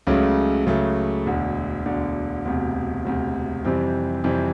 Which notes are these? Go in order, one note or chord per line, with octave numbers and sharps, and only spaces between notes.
C#2 C#3 F#3 A3
C#2 C#3 F#3 A3
E1 D2 D3
E1 D2 D3
E1 D2 C3
E1 D2 C3
F2 C3 E3 G3 C4
F2 C3 E3 G3 C4